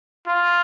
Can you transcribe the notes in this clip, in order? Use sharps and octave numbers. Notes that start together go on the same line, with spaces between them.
F4